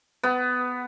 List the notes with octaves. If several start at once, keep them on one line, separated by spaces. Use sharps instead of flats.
B3